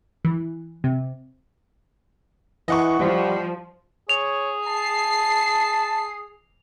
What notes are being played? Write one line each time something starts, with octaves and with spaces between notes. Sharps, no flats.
E3
C3
E3 D#5 F#5 C#6
F3 G3
G#4 C#5 F7
A5 C7